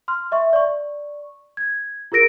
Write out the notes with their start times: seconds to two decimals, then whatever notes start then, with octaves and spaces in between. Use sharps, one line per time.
0.08 C6 F6
0.32 D#5 E5 C#6
0.53 D5 C#6
1.57 G#6
2.12 F4 G#4 A#4 A#6 D7